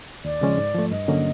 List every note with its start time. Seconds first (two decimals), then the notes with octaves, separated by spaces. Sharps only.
0.25 D#2 D5
0.41 C#3 F3 G#3 C#4
0.58 G#2
0.74 F3 A3
0.91 G2 D#5
1.08 D3 F#3 A#3 C#4